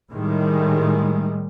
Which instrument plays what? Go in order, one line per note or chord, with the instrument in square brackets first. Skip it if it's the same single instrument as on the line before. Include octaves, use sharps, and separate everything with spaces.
[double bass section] A2 D#3 G3 G#3